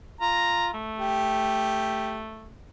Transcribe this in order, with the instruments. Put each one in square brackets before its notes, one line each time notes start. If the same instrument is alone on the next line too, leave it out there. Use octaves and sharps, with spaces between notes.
[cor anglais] F4 [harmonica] A#5
[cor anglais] A3
[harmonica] G4